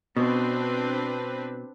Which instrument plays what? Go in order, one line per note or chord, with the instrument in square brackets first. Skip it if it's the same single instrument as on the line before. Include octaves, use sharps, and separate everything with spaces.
[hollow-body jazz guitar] B2 [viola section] C4 D4 B4